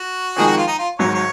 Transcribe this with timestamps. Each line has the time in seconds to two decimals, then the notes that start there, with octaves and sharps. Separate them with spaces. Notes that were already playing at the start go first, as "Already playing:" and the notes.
Already playing: F#4
0.36 F2 D#3 G#3 G#4
0.47 F#4
0.57 F4
0.67 D#4
0.78 F4
0.99 G#1 G#2 F#3 C#5
1.15 C#5